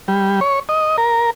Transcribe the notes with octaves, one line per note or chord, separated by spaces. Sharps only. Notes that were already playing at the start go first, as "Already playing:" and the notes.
G3
C#5
D#5
A#4